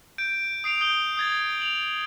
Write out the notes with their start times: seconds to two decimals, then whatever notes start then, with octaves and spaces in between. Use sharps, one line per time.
0.18 G6 D7
0.64 D#6 C7 D7 F7
0.81 D#6 G6 G7
1.17 D#6 G#6 A6
1.61 F7 F#7